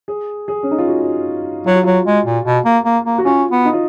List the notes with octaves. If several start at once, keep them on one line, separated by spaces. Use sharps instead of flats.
G#4
G#4
C#4
D#4
F4
F#4
F#3 F4
F#4
F#3 F4
G#3
A#2
B2
A#3
A#3
A#3
F#4
C#4 F4
B3
D#4
F4